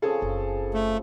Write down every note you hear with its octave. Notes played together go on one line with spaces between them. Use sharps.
C#3 F3 C4 G#4 A4
F#1
A3